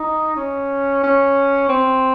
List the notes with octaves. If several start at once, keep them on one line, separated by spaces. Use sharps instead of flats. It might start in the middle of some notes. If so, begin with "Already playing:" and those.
Already playing: D#4
C#4
C#4
C4